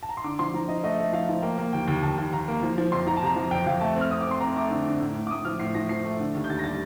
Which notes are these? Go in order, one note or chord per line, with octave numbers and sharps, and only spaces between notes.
A5
A#5
C6
D3 D6
F3 C6
F3 A#5
F3 D#5
A3 D#5
A3
F3 F5
F3
A#3 G5
A#3
D#2 G5
D#2 G5
D#2 A5
D#2
D#2 A#5
A#3
F3
F3
F2 C6
F3 A#5
A5
C3 A#5
F3
F2 G5
F2 F5
A3 A5
C4
F6
C4 D#6
D6
C4 C6
C4 A#5
A3 D6
D3
D3
A2
A2
D6
A2 D#6
F3 F6
A2 C7
F3 A#6
F3 C7
A3
D3
D#2
G6
D#2 A6
A#6
G3 A6